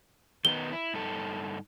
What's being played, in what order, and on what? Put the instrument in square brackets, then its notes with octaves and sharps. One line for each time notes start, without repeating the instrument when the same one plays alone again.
[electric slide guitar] D#3 B3 D#4 [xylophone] G7
[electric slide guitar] E4
G2 D#4 A4